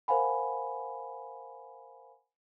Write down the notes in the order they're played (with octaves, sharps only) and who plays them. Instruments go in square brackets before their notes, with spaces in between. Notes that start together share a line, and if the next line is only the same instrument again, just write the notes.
[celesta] A#4 C5 F5 F#5 G#5 B5